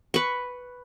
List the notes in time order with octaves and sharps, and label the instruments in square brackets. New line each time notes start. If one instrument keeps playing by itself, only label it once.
[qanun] B4 C#6